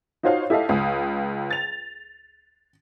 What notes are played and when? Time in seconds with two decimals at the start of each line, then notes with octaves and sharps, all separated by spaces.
0.23 D#4 F4 F#4 C5 C#5 F5
0.50 E4 G4 A4 D#5 F5
0.69 C#2 F5 D#6
1.50 A6 F7